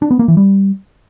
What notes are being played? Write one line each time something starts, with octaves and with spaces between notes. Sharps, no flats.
D4
B3
A#3
E3
G3